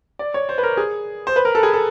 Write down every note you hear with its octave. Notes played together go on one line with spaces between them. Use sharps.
D5
C#5
C5
B4
A#4
G#4
C5
B4
A#4
A4
G#4
A4